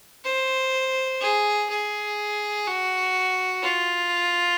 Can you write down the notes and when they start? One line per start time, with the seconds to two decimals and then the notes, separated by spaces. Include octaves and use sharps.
0.25 C5
1.21 G#4
1.70 G#4
2.66 F#4
3.63 F4